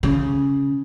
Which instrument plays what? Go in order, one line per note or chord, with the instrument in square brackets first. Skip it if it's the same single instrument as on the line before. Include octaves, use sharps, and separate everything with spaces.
[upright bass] C#3